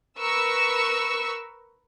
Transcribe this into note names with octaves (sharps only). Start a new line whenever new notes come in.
A#4 B4 C#6 E6